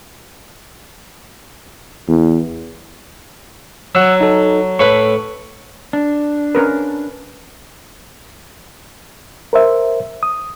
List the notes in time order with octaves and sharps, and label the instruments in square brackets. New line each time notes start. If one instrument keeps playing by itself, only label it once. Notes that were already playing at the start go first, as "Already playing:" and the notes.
[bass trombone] E2
[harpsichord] F#3 [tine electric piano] F#5 E6
[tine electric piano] D#4 A4
[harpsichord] A2 B4 [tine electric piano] A4 C#6
[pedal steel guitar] D4
[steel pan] C#4 A#4 B4
[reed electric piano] A#4 C5 E5
D#6